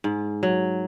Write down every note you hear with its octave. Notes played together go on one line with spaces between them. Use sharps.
G#2
F#3